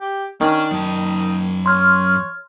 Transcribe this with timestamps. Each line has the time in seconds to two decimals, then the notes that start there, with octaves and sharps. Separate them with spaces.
0.01 G4
0.41 D#3 C#4 D4
0.71 F#2 D#4 A5
1.66 C#5 C6 F6